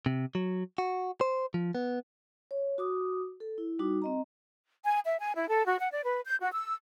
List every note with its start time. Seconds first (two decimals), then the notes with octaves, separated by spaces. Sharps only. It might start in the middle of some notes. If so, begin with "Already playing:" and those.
0.06 C3
0.35 F#3
0.78 F#4
1.21 C5
1.54 F3
1.75 B3
2.51 C#5
2.78 F#4 D6 D#6
3.40 A4
3.58 E4
3.79 G3 D#4 F#4 D6
4.02 C4 D#5 A#5
4.84 G#5
5.05 E5
5.19 G#5
5.35 E4
5.49 A4
5.65 F#4
5.79 F#5
5.91 D5
6.05 B4
6.25 G6
6.40 F#4
6.53 E6